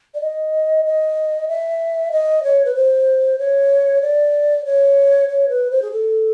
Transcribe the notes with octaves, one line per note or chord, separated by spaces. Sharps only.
D5
D#5
D#5
E5
D#5
C#5
B4
C5
C#5
D5
C#5
C#5
B4
C5
G#4
A4